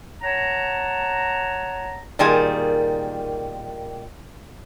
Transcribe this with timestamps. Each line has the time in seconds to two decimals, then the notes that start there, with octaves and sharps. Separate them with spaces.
0.21 C#5 F#5 A5 A#5
2.19 A#2 D#3 G3 G#4 G#5